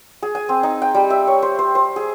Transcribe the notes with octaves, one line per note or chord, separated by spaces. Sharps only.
G#4
G#5
C4
D#4
G5
G3
E5
C#5
C5
C5
C5
G#4